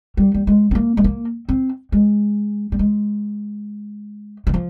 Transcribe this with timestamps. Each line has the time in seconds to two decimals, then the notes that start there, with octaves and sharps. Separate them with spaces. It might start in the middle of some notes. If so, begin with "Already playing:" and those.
0.17 G3
0.34 G3
0.47 G#3
0.71 C4
0.75 A#3
0.97 G#3
1.04 A#3
1.49 C4
1.92 G#3
2.72 G3
2.79 G#3
4.47 D#3
4.54 F3